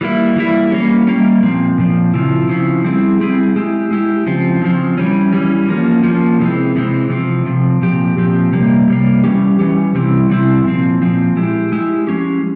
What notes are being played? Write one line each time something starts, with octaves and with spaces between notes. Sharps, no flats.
E3 G3 A#3 E4
E3 G3 A#3 E4
G3 A#3 C#4
G3 A#3 C#4
A#2 F3 C4
A#2 F3 C4
C#3 F3 C4 E4
C#3 F3 C4 E4
G3 C4 E4 G#4
G3 C4 E4 G#4
G#3 E4 G4
G#3 E4 G4
C#3 F3 C4
C#3 F3 C4
E3 G3 C#4
E3 G3 C#4
F3 A#3 C#4
F3 A#3 C#4
C3 E3 G#3 C4
C3 E3 G#3 C4
C3 F3 C4
C3 F3 C4
A#2 F3 C4 G4
A#2 F3 C4 G4
C3 G3 A#3
C3 G3 A#3
E3 G3 C#4 G4
E3 G3 C#4 G4
C3 G3 C4 E4
C3 G3 C4 E4
A#2 F3 C4
A#2 F3 C4
G#3 E4 G4
G#3 E4 G4
F3 G#3 C#4 G4